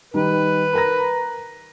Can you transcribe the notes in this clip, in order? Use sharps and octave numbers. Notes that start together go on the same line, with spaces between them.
D#3 G3 B4
A#4 A#5 A#6